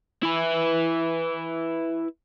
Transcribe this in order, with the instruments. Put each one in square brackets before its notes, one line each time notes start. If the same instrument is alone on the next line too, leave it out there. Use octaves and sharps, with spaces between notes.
[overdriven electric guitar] E4 B4